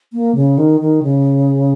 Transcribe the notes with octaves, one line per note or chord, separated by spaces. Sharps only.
A#3
C#3
D#3
D#3
C#3